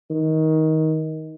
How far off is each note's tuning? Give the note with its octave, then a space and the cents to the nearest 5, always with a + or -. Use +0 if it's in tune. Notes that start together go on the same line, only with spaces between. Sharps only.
D#3 +20